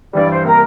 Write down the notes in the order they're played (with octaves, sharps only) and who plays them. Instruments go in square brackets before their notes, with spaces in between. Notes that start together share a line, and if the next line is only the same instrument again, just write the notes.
[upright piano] G2 E3 G3 [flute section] D5
[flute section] C5
[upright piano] C3 G3 A#3 [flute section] A#4